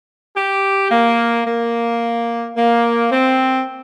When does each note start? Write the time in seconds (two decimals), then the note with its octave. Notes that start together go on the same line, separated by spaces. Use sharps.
0.36 G4
0.91 A#3
1.46 A#3
2.56 A#3
3.12 C4